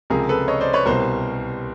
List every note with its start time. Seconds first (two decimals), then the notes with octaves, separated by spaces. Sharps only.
0.10 C#2 C3 F3 G#4 A#4
0.29 A4 B4
0.48 C#5 D#5
0.60 C5 D5
0.73 B4 C#5
0.86 C2 B2 G3 A#4 C5